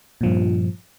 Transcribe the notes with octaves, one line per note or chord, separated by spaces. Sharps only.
G2 A#2 F3